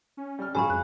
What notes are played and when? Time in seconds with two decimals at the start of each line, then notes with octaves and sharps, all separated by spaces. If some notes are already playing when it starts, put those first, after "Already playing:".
0.17 C#4
0.39 G3 F6
0.55 G#2 C#3 F#3 F4 G#5 B5 C#6
0.70 F2 F#6